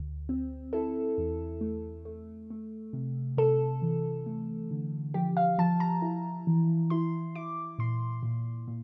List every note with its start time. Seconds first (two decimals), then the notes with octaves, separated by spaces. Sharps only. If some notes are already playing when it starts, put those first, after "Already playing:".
Already playing: D2
0.29 C4
0.73 E4 A4
1.18 E2
1.61 A3
2.05 A3
2.50 A3
2.93 C3
3.37 C3 A4
3.82 E3
4.26 A3
4.71 D3
5.14 F3 G4
5.37 F5
5.58 F3 A5
5.80 A#5
6.02 E4
6.47 E3
6.90 E4 C6
7.35 E4 D6
7.79 A#2 C6
8.23 A#2
8.68 A#2